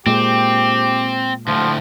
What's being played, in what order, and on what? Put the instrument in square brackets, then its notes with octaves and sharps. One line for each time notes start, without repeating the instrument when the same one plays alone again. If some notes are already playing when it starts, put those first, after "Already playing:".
[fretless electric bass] A#2 G#3 [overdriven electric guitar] C4 [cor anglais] G4
[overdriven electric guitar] D2 A2 [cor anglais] F3